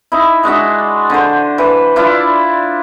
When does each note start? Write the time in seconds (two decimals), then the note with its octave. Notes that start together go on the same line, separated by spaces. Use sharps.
0.12 D#4 E4
0.43 G#3 D4 F#4 E5
1.10 D3 C5
1.58 E3
1.96 D4 E4 F4 D5